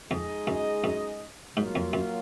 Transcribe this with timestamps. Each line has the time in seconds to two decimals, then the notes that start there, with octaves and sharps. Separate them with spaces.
0.11 F2 G#3 D#4 G#4 D#5
0.47 F#2
0.84 F#2
1.57 G#2 F#3 A#3 F4
1.75 F2
1.93 F#2